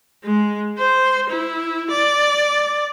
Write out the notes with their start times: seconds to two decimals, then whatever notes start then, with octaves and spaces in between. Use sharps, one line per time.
0.24 G#3
0.79 C5
1.30 E4
1.91 D5